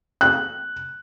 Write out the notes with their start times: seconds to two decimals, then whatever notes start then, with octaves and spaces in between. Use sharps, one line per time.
0.21 F#6